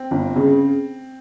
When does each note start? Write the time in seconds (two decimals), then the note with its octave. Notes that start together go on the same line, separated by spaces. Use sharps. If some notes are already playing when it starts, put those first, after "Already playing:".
Already playing: C4
0.11 G1
0.36 C#3